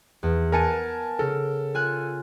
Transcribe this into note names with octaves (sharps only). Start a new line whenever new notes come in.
E2
B3 A#4 G#5 A5 C#7 D#7
C#3 A4 A#4
F4 G#5 F#6